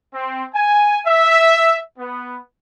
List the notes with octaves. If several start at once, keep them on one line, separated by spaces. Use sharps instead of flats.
C4
G#5
E5
B3